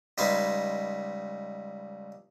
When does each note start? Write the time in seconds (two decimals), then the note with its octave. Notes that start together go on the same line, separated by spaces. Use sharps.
0.18 C#2 G3 D#4 B4 C5 G#5